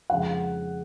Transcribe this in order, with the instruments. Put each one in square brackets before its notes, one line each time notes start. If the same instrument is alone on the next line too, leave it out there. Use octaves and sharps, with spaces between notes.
[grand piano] F2 C#3 F3 G#3 D#4 [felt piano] F#5